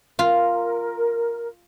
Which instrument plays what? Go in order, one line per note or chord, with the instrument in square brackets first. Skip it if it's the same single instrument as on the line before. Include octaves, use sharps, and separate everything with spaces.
[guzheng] F4 [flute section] A#4